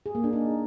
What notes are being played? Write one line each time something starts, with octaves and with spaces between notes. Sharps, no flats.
G#4
A#3
D4
D#4